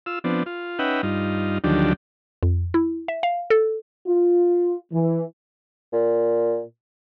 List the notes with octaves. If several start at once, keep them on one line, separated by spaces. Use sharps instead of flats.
F4 E6
F3 B3 C4 D4
F4
C#4 D#4 B4 E5 F#5 G5
G2 D#4 F4
D2 D#3 F3 F#3 D4 G4
F2
E4
E5
F5
A4
F4
E3
A#2